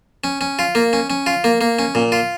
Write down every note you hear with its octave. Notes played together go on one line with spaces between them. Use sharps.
C#4
C#4
F4
A#3
C#4
C#4
F4
A#3
A#3
C#4
A#2
F4